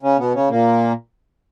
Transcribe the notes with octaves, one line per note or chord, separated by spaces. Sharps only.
C#3 C#4
B2 B3
C#3 C#4
A#2 A#3